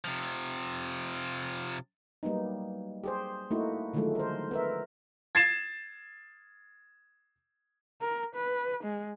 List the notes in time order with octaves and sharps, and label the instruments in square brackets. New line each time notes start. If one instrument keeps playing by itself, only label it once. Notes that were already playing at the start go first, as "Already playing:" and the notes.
[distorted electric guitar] C3 F3
[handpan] F#3 G3 A#3 B3 D#4
G4 G#4 C5
A3 A#3 D#4 E4 F#4
D3 D#3 F3 F#3 G#3 A3
A#4 C5
B3 A#4 E5
[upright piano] G#6 A6 C7 E7
[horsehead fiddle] A#4
B4
G#3